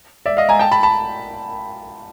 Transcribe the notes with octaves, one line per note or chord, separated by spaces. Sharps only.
D5 E5
D#5 F5
G#5 A#5
G5 A5
A5 B5
A5 B5